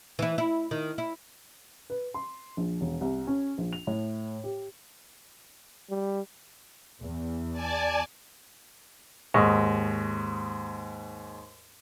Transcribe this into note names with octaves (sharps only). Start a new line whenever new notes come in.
E3 E4
E4
D#3
E4
B4
C6
A#1
E1
C2
C#4
A#1
F7
A2
G4
G3
E2
D5 G#5 A5
D#2 G#2 D#5 C#6